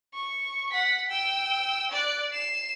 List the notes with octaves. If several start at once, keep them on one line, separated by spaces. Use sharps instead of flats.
C#6
F#5 B6
G5 E6
D5 F#6
C7 E7